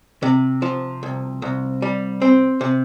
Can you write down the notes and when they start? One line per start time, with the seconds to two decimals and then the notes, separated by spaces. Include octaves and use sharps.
0.23 C3
0.62 F3
1.03 C2
1.42 C2
1.82 G3
2.22 C4
2.61 C3